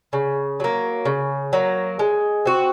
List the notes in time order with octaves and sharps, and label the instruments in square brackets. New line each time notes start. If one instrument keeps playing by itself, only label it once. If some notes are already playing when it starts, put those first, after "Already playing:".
[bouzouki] C#3
F#3 A#3
C#3
F#3 A#3
G#3
C4 F#4